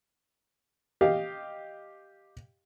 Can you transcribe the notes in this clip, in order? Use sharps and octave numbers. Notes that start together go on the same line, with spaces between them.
G4 D#5 F5